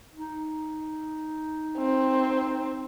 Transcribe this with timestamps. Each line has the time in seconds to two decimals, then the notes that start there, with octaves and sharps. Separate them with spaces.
0.13 D#4
1.78 C4